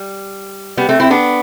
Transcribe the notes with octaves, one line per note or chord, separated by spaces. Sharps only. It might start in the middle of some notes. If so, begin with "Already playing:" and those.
Already playing: G3
G3 B3
A3 C4
C4 E4
B3 D4